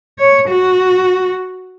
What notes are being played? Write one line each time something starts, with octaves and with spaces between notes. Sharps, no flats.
C#5
F#4